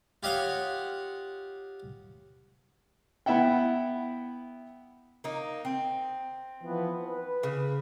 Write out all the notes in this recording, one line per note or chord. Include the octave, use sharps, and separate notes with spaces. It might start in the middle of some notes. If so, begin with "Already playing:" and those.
F4 G4 C#5 D#5 F5 F#5
B3 E4 E5 F#5 G5
A#3 D#4
C4
E3 F3 B3
B4
C#3